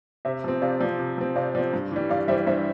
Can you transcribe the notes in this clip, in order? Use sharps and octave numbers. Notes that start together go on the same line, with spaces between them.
C3 C5 E5
F3 C4
C3 D5 F5
F3 C4
C3
F3 C4
C3 D5 F5
F3 C4
G2
E3 G3
G2 D5 F5
E3 G3 C5 E5
G2 C5 E5